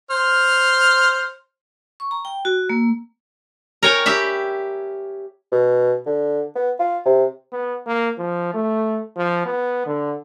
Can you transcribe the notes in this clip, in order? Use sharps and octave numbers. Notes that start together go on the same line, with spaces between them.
C5 F6
C#6
A#5
G5
F#4
A#3
A#4 C#5 G5 G#5
G4 E5 B5
B2
D3
B3
F4
C3
B3
A#3
F3
A3
F3
B3
D3